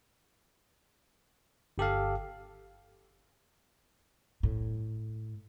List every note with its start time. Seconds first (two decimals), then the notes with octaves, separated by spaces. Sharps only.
1.78 G1 G4 A4 F5
4.43 A2